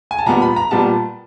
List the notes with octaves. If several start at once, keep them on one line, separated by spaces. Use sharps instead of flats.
G#5
A5
A#2 G3 B3 A#5
B5
A#5
A#2 G3 B3 A5